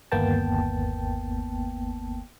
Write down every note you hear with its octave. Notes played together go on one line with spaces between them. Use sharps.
G1 D#2 A#3 B3 G5 A5